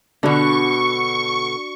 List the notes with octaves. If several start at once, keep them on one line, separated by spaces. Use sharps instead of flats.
B2 D3 D4 F#4 C#6